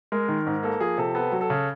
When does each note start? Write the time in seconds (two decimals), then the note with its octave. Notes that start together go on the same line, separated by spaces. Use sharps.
0.12 G#3 A#4
0.29 D#3
0.46 G#2
0.63 A#3 A4
0.80 F3 G#4
0.98 C3 A4
1.15 B3 A4
1.32 F#3
1.41 A4
1.50 C#3